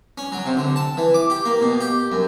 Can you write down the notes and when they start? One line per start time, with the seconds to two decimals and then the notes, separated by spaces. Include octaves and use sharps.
0.18 C#4
0.32 F#3
0.46 C3
0.57 D3
0.76 A5
0.97 E3
1.14 D6
1.30 G4
1.45 A#3
1.62 B2
1.81 G4
2.12 F#2